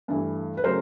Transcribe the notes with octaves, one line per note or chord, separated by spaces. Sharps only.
G2 E3 A3
B4
C#3 F#3 A3 A#4 C5